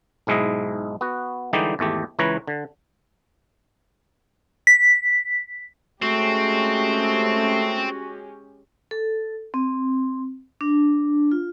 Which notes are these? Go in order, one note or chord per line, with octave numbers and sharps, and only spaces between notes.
B1 G#2 G#3 E4 D#5
B3 F#4
D3 E3 G3 G#3 D#4 G4
G#1 E2 A3 G4
C#2 E3 B4 C#5 A#5
D3
B6
G#3 A3 C4 C#4 F#4 G4
A4
C4
D4
F4